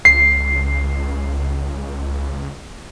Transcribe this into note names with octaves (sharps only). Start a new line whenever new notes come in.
C#2 C7